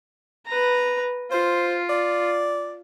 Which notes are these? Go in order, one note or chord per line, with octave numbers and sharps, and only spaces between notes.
B4 A#5
F4 C5
D5